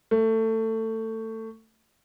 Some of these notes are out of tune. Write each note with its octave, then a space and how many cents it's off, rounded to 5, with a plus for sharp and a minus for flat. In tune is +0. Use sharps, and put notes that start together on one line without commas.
A3 +20